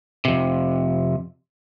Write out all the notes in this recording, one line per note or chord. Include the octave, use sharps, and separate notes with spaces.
F2 C3